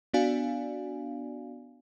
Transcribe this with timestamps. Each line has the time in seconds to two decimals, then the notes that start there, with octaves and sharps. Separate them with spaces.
0.14 B3 D4 F#4 D5 F5 G#5